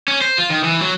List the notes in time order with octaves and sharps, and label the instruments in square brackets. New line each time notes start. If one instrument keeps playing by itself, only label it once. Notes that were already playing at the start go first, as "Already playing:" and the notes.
[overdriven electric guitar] C#4
C5
F4
D#3
E3
F#3